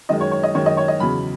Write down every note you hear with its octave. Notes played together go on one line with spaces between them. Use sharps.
F#2 D#3 G#3 D#5
C#5
C#5
D#5
F#2 D#3 G#3 C#5
D#5
C#5
D#5
E2 C#3 F#3 B5